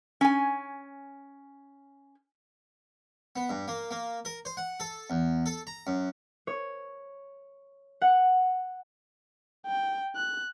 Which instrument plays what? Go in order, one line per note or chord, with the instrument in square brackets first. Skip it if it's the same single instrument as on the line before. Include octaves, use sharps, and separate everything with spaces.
[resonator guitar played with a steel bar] C#4 G#5
[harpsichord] B3
G2
A#3
A#3
A#4
C5
F#5
A4
E2
A4
A#5
F#2
[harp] C#5
F#5
[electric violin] G5
F#6